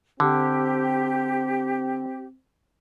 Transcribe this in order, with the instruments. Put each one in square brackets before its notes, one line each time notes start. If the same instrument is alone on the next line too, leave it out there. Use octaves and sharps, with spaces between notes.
[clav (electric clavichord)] D3 [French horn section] C4 [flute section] G4